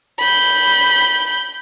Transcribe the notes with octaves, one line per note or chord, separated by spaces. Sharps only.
B5 G6